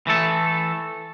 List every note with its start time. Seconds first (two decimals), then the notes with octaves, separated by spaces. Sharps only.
0.07 E3 A3 A4